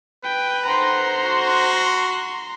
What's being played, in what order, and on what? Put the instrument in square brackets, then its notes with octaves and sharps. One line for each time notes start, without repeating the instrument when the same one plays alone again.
[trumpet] B4 [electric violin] G5
[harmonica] C5 F#5 [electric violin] A#5 C6
[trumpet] F#4